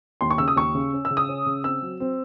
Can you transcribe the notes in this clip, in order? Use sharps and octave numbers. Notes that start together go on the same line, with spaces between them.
D#2 C6
C#6
C#3 E6
D#6
D#2 C#6
C#3
C#4
E6
C#3
D#6
C#4
C#3
C4 E6
F#3
C4